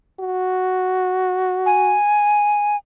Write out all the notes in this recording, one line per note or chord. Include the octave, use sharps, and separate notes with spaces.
F#4
G#5